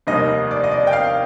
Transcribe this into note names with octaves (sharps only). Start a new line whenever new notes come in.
F1 D#2 D#3 G3 A#3 D#5
D5
D#5
D5
G5
F5